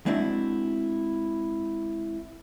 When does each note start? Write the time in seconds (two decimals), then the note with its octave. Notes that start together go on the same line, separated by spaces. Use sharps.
0.06 G#3 C4 D4 E4 F#4